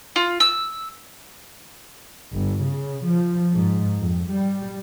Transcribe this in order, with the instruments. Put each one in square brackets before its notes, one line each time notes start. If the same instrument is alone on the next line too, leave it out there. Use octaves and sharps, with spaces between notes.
[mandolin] F4
E6
[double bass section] G1
C#3
F3
G#2
F2
G3